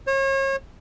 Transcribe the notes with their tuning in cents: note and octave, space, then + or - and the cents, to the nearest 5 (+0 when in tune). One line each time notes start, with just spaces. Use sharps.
C#5 -35